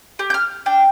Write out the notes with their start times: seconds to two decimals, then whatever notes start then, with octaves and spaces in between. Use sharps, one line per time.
0.19 G4
0.30 G6
0.34 F6
0.66 D4 G5